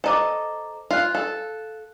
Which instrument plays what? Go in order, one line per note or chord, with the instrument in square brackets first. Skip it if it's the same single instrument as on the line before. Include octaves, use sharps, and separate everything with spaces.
[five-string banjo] A4 D#5 [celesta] C5 A#5 D6
[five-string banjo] F4 [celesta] F5 F#6
[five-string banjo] A4